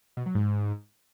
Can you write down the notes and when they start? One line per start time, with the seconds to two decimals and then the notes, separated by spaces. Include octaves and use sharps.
0.17 B2
0.26 F#3
0.35 G#2